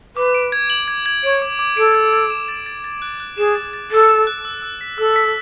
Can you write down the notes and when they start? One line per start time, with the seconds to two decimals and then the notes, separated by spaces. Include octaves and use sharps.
0.16 B4 D6
0.34 D7
0.52 G#6
0.70 F#7
0.88 G#6
1.06 G#6
1.24 C#5 D7
1.42 D6
1.59 D6
1.77 A4 D7
1.95 G#6
2.13 G#6
2.30 E7
2.48 A6
2.66 A6
2.84 A6
3.02 F#6
3.20 F#6
3.38 G#4 E7
3.55 A6
3.73 A6
3.91 A4 A6
4.09 E7
4.27 F#6
4.45 E6
4.62 E6
4.81 B6
4.98 A4 E6
5.16 B6